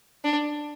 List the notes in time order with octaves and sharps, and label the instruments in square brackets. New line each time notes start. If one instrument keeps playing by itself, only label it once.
[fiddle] D4